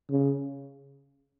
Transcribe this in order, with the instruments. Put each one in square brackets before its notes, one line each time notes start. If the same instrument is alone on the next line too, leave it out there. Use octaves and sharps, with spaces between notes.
[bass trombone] C#3